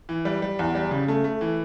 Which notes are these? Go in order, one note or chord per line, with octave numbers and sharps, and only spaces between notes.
E3
G3
G3
E2
G3
C#3
A3
A3
E3